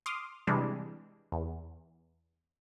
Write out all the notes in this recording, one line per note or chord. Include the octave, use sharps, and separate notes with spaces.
C6 D6 D#6 F6
C3 E3 G3 G#3 D4
E2